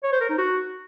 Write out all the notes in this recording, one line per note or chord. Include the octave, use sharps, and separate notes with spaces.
C#5
C5
A#4
D#4
F#4